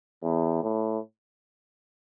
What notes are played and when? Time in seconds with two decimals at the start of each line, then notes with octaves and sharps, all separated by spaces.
0.23 E2
0.63 A2